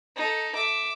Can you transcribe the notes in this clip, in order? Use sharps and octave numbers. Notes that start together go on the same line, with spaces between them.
D#4 A4
E5 D6